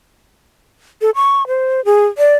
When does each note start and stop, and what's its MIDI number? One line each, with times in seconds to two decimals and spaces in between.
1.01 1.10 69
1.15 1.47 85
1.47 1.84 72
1.85 2.07 68
2.18 2.37 74